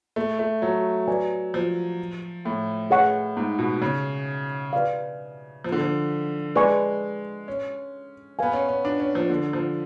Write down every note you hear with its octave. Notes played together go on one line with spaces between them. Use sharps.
A3
A3
F#3
F#4 B4 D5 G#5
F3
A2
G#4 C#5 F#5 C#6
G#2
B2
C#3
B4 D5 F5
F3
D3
F3
G#3 B4 D5 G#5 C#6
C#4
B3 B4 F5 G#5
C#4
C#4
D4
C#4
F3
D3
F3